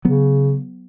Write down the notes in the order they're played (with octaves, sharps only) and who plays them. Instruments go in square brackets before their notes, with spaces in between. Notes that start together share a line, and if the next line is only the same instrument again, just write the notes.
[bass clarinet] C#3 [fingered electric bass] F#3 B3